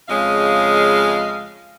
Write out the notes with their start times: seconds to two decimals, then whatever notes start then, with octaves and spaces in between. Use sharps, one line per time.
0.09 F2 C#3 G#3 D#5 F5